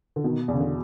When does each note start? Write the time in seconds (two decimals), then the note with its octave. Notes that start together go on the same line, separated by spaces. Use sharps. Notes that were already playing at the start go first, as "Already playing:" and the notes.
0.16 D3
0.24 B2 D#3
0.48 E2
0.54 C#3
0.60 D3